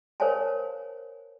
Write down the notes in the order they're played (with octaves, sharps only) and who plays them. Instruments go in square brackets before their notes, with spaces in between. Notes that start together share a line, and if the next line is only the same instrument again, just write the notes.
[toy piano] A#4 C5 C#5 F5 G#5 A5